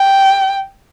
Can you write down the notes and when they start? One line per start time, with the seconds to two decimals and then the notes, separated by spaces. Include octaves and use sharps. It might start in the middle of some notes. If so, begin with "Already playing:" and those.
Already playing: G5